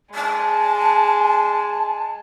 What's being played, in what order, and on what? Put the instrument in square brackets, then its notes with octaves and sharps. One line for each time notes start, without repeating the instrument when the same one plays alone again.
[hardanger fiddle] G#3 [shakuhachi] A5